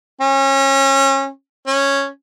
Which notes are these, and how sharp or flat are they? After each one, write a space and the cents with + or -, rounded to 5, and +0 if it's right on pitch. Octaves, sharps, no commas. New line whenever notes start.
C#4 -30
C#4 -5